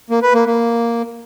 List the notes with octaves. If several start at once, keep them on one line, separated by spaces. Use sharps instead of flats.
A#3
B4
A#3
A#3